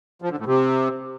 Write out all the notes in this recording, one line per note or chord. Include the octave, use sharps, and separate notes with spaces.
F3
D3
A2
C3